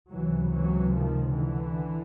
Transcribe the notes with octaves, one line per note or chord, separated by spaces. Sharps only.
C#2 C3 E3 F#3
E3 F#3
D#3 F3
D3 E3